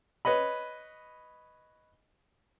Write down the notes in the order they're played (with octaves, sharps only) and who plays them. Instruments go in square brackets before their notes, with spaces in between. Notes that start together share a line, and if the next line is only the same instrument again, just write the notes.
[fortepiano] B4 C#5 D#5 B5